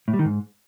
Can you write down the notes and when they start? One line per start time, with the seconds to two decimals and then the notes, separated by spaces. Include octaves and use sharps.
0.08 A2
0.13 G3
0.19 D#3
0.25 G#2